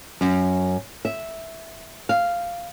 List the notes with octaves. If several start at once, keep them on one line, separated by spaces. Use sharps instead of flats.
F#2
E5
F5